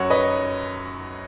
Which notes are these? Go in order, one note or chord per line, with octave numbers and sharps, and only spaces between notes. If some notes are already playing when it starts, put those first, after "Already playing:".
Already playing: F#2 F#3 C#5 F#5
B4 D#5